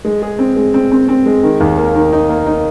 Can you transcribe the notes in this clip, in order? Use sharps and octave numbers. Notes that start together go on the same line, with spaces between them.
G#3
G#4
C4
G#3
C4
C4
C4
G#3
D#3
D#2
A#3
D#3
D#4
A#3
D#4